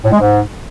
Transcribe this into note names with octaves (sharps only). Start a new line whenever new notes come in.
A2
G#3
G#2